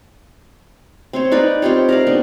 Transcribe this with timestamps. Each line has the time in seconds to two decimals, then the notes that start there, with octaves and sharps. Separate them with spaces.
1.13 C4 C5 C#5
1.31 D#4 B4 D5
1.62 C4 F4 G4 C#5
1.89 A#4 D5 F5
2.07 B3 D4